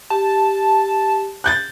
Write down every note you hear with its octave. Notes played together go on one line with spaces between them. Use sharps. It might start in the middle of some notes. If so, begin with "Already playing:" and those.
G4 A5
F#6 G6 A6